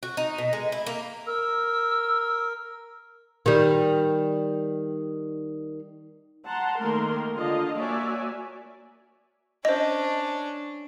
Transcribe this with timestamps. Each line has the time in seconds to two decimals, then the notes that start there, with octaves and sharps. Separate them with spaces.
0.03 F#4
0.17 D#4
0.38 B2
0.53 G#3
0.72 E4
0.87 A#3
1.27 A#4 E6
3.46 D#3 G3
6.45 F#5 A5 A#5 C6
6.79 D#3 A3 A#3 A#4 C6
7.35 D3 F4 D#5 F5
7.79 A#3 F#4 C#5 D5 E5 G#5
9.65 C#4 D4 C5 D#5